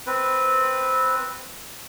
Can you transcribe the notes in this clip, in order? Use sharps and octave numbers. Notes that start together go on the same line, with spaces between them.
C4 B4